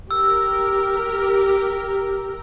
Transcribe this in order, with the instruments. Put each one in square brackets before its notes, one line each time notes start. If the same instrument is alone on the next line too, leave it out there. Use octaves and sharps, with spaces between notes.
[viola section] G4 A#4 [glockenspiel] E6